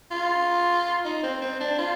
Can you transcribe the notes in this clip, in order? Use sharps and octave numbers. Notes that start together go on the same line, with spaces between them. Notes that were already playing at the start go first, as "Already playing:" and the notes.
F4
D#4
C4
C4
D4
F4